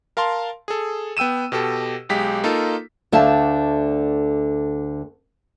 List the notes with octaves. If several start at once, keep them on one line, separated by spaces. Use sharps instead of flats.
A#4 F5 A5 C6
G#4 A4
B3 G5 E6 D#7 E7
B2 G4 A4
B1 G#3 G4 B6
A#3 D#4 F4 A4
D2 D3 A3 E5 F5 A5